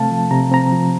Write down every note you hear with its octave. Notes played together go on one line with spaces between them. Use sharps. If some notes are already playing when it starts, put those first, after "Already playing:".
Already playing: C3 A3 C4 F5 A5
F3
C3 A#5
C4 A#5
F3